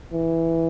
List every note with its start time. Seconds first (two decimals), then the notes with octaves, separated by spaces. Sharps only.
0.13 E3